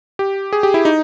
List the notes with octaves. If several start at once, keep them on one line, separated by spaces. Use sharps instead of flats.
G4
G#4
G4
E4
D#4